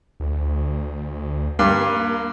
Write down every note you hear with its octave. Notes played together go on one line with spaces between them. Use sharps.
D2
G2 A#3